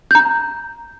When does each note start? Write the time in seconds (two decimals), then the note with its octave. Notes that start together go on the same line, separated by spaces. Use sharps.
0.11 A#5 G6